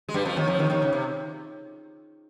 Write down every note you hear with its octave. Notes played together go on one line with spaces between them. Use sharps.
G#3
G2 G3
F2 F3
D#2 D#3
F2 F3
D#2 D#3
D#2 D#3
C#3
C3